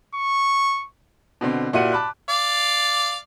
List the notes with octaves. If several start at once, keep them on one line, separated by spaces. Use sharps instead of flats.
C#6
B2 D3 C4
A#2 E4 F#4 G4 F#5 D#7
A5 B5 D6 F#6
D5 F5